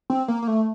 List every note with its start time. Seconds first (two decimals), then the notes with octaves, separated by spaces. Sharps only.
0.10 C4
0.28 A#3
0.42 A#3
0.48 A3